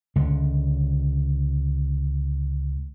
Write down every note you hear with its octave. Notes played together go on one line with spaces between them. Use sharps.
C#2 D3